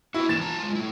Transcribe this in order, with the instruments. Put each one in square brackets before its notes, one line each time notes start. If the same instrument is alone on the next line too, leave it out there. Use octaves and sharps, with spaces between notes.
[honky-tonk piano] E4 [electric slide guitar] F#4 G4 B4
[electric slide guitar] E3 A#3 D4 [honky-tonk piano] A6 E7
[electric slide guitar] F4 A5 A#5
G#3 F4
A3 E4